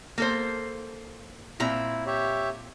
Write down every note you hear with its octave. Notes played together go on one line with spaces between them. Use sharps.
A#3 A4 C5
A#2 C4 E4 A#5
G4 C#5 E5